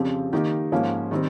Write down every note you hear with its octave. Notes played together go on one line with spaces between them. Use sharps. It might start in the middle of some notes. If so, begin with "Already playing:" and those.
Already playing: F2 C#3 F3 C4 G4
D#3 A#3 D#4 G4
G#2 F3 A#3 C#4
D#3 G3 C4